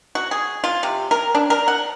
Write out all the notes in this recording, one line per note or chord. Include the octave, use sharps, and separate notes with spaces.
F#4
G#4
F4
C3
A#4
D4
A#4
F#5